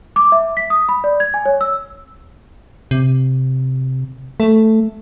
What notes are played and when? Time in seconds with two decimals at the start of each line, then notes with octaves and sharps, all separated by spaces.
0.16 D6
0.32 E5
0.57 B6
0.70 D#6
0.89 B5
1.04 D5
1.20 G#6
1.34 G#5
1.46 C#5
1.61 E6
2.91 C3
4.40 A3